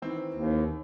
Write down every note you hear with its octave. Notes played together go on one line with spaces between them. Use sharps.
D#3 E3 C4
D#2